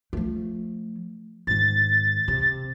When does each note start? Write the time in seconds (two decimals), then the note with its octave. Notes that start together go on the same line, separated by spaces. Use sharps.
0.13 F3 A3
1.47 G#2 D#3 A6
2.28 C3